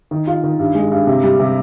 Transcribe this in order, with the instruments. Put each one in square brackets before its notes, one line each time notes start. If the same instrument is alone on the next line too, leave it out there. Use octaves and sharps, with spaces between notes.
[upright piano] D#3
F4
D#3
G2
G#3
G2
C3
G3
C3